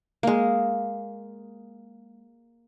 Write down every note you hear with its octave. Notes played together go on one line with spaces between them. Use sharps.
G#3 A#3